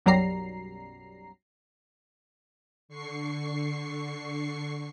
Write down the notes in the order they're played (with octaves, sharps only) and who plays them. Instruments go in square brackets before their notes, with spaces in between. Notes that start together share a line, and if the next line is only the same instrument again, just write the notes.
[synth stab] B1 F#2 F#3 G3 A#5 C7
[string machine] D3 C#6 C7